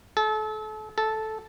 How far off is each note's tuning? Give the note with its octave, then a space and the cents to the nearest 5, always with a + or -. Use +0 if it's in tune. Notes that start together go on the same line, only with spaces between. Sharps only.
A4 -35
A4 -10